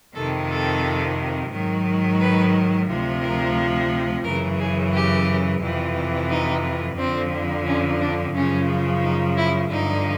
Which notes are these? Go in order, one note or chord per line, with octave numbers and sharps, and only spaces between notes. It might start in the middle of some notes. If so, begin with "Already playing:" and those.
F2 C3 D#3 A4
A4
G#2 D#3 F#3
B4
D2 C3 F3
A#4
F#2 C#3 E3 A#4
G#4
G4
F2 C3 E3
D#4
F2 D3 F3 C4
C#4
D4
F#2 C#3 F3 C#4
D#4
E4
G2 D3 F3 D#4